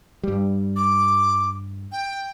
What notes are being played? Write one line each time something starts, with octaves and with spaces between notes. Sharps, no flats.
G2 G3
D6
G5